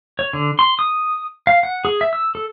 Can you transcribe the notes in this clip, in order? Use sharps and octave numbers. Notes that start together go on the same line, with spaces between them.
C#5
D3
C6
D#6
F5
F#5
G#4
E5
E6
A4